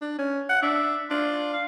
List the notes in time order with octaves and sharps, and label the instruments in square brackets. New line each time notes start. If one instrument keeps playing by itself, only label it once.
[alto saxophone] D4
C#4
F#5
[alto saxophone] D4 [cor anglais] E5
[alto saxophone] D4 [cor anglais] F4
[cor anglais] F5